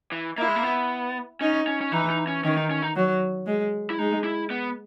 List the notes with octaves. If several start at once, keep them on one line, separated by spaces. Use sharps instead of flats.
E3
A#3 E4
G#3
A#3
B3
C#4 D#4
C#4
C#4
E3 D#4
D#4
C#4
D#3 C#4
D#4
C#4
D#4
F#3
G#3
E4
G#3 D#4
E4
B3